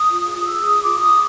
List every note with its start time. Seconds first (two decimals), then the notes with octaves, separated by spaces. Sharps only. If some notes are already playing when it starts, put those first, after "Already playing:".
Already playing: D#6
0.09 F4
0.26 G#4
0.45 G#4 E6
0.64 G#4 D#6
0.83 F4 D6
1.00 F4 D#6